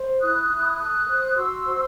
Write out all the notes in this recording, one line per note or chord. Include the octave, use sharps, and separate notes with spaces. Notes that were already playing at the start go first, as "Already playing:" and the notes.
Already playing: C5
E4 D#6 F#6
E4
A4 D#6 F#6
C5
F#4 C6 E6
C5